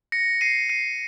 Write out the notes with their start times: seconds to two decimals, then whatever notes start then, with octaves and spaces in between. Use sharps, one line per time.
0.12 A#6 C#7
0.41 C7 D#7
0.70 C7 D#7